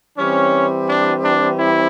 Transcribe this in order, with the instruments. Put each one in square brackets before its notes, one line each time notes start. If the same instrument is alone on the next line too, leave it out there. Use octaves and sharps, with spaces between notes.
[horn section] E3 G3 C4 C#4
D4
D4
E4